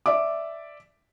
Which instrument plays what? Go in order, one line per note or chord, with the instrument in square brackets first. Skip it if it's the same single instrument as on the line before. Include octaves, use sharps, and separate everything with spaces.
[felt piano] D5 E5 D6